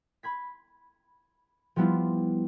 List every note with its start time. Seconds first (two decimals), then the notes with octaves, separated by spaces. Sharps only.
0.23 B5 G#6 B6
1.76 F3 G3 B3 E4 F4